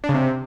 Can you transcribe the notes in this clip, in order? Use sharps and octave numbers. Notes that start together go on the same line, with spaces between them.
D4
C#3
C3